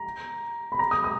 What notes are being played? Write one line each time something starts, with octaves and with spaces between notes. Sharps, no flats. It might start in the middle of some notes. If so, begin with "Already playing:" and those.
Already playing: A#5
B5
A#5
D#6
D#6